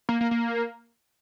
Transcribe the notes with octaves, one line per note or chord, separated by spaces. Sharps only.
A#3
A#3
A#3